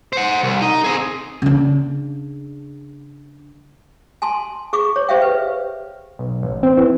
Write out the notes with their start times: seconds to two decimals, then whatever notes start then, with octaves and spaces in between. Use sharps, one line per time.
0.13 C5 F#5
0.43 C2
0.62 D#4
0.84 C4 G#4
1.42 C#3 D4
4.22 G#5 A5 C6
4.73 G#4 C#6 D6
4.96 C#5
5.09 G4 C5 C#5 E5 F5 G5
5.22 B4
6.19 B1
6.43 A1
6.63 C4
6.77 E3